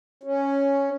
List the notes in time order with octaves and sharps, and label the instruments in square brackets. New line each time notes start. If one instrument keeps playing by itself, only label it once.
[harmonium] C#4